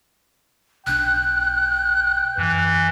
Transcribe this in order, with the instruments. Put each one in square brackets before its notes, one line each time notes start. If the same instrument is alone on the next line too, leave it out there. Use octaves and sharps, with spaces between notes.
[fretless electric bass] B1 D4 [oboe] G5 [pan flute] F#6
[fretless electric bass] F#2 [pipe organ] E3